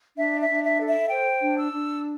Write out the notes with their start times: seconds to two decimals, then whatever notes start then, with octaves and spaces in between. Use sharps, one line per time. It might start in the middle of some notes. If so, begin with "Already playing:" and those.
0.17 D4 E5
0.41 E5
0.49 D4
0.64 E5
0.80 A4
0.88 E5
1.11 C5 G5
1.42 D4
1.58 E6
1.73 D4